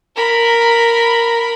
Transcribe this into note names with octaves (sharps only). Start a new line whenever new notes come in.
A#4 B5